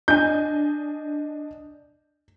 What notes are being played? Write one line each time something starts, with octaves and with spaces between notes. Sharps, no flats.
D4 D#5 G#5 G6